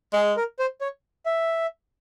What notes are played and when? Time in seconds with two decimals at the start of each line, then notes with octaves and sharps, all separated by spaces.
0.13 G#3 G#4
0.37 A#4
0.59 C5
0.81 C#5
1.26 E5